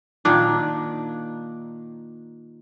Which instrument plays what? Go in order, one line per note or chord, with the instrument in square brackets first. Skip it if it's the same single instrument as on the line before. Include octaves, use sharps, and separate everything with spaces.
[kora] A#2 D#3 D4